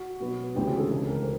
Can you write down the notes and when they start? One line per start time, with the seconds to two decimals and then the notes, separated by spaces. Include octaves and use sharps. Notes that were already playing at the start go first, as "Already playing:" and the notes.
Already playing: F#4
0.20 B2 F#3 B3
0.55 D2 C#3 E3 G#3 C4 G4
0.67 G#4
0.79 A4
0.91 C#2 C#3 E3 A4
1.09 A#4
1.23 C5